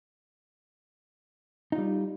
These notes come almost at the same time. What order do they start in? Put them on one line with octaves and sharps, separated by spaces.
D#4 F4 G3